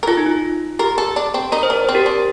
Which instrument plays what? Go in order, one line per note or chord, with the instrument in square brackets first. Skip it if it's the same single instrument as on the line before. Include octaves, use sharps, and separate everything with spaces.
[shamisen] A#4
[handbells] F4 [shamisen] A4
[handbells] D#4
F4
[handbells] G4 [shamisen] A#4
[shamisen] A4
D4
C4
[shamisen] D#4 [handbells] A#4
[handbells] C5
[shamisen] D4 [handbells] A#4
[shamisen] C4 [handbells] C5
[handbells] G4 A#4
[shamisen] D4